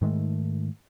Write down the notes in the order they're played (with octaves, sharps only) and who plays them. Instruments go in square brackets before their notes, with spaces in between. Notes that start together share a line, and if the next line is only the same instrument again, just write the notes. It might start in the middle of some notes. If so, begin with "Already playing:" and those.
[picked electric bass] G#2 D#3 G#3 A3